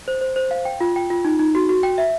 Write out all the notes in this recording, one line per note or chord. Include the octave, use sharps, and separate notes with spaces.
C5
C5
C5
F5
G5
F4
G5
F4
D#4
D#4
F#4
F#4
G5
E5